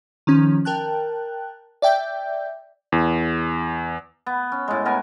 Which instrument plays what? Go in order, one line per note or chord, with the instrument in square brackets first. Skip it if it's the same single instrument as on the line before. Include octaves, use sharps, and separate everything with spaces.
[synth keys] D#3 F3 C#4
A#4 G5 A5 F#6
D5 E5 G5 G6
[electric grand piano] E2
[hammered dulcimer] B3
C#4
A2 G#3
B3 A#4 G#5